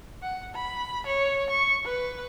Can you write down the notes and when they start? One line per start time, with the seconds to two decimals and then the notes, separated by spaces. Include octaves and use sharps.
0.22 F#5
0.55 B5
1.07 C#5
1.50 C#6
1.85 B4